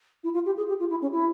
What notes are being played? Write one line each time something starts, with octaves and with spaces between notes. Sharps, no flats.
E4
F4
G4
G#4
G4
F4
E4
C#4
E4